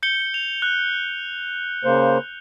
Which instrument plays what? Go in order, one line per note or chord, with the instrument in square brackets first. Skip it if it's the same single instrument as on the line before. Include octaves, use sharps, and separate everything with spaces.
[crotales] G6 C#7 G7
F7
F#6
[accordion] C#3 A#3 C5